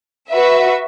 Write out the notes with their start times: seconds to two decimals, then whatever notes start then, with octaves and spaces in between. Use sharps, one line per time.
0.31 F#4 B4 E5